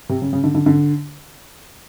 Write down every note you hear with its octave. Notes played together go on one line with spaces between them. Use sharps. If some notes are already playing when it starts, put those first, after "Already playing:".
C3
C#3
C#3
D3
D3
D3